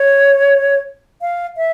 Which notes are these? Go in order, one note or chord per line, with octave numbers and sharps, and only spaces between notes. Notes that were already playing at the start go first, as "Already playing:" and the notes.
Already playing: C#5
F5
E5